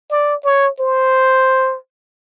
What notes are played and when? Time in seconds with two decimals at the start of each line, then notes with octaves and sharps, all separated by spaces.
0.11 D5
0.45 C#5
0.80 C5